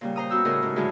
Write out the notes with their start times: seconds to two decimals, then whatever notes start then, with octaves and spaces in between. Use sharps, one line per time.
0.01 A#2 C#3 G3
0.16 C5 A#5 D#6
0.30 B3 C#4 F#4 E6 G6
0.45 A2 C#3 G#4 A#4 D#5
0.62 G#2 C#3
0.76 A2 D3 F#3 G#3 G#4